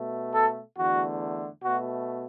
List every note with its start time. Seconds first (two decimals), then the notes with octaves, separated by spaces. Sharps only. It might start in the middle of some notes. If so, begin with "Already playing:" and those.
Already playing: B2 A3
0.34 A4
0.78 E2 D3 A3 F#4
1.64 B2 A3 F#4